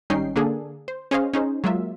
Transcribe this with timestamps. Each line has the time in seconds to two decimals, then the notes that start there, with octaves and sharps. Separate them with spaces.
0.10 G#1 G3 C#4 D#4 G5 C7
0.36 D3 A#3 D4 G#4 A4
0.88 C5
1.11 C#4 G#4 C5 C#5 D#5 F5
1.34 C#4 D#4 G#4 C5
1.64 F#3 G#3 A#3 F4 E5